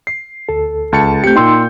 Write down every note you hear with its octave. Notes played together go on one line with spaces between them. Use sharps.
C7
D2 A4
C#2 A5 C#7
A3 C4 G4 G6 C#7
A#2 D#4 G5 C6 E6